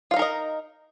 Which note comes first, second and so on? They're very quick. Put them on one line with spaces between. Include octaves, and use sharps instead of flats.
F4 F5 D#4 A#4 D#5